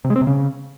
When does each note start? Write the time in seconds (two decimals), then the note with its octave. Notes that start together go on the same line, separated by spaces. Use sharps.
0.04 C3
0.10 G#3
0.16 C4
0.21 C3
0.27 C#3